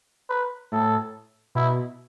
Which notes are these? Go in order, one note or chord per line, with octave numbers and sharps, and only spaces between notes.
B4
A2 A4
B2 E4